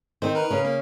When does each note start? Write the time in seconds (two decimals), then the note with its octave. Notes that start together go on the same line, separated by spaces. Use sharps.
0.22 D#3 C4 C5
0.35 A#4 B4
0.51 C#3
0.65 A#3